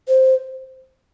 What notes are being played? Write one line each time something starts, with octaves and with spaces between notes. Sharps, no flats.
C5